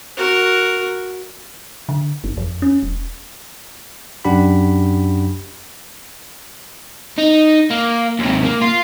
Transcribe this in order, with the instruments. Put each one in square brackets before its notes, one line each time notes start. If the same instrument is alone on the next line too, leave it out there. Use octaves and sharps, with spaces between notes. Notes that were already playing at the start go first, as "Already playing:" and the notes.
[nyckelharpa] F#4 A#4
[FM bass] D3
G1
F2
C#4
E1
[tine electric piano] F#2 D4 G4 F#5 B5
[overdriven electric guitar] D#4
A#3
D#2 C3
A#3
F4